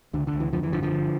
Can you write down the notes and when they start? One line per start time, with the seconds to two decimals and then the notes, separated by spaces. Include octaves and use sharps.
0.13 C#2 D3
0.27 D3
0.33 C#2
0.40 E3
0.53 F2 D3 F3
0.63 E3
0.73 G1 D3 F3
0.83 D3 F3
0.92 G1